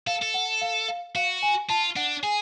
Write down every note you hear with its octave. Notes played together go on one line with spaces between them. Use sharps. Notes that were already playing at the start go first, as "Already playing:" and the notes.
A4 F5
A4
F#5
F5
F5
F#4 F5
G#5
F4 A5
D4 F#5
G#4 G#5